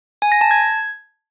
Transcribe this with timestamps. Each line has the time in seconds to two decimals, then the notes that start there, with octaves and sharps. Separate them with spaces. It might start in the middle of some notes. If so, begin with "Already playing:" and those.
0.22 G#5
0.32 A#6
0.41 A5
0.51 G#6